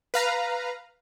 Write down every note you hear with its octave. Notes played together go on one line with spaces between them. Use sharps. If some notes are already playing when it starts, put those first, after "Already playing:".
B4 F5 A#5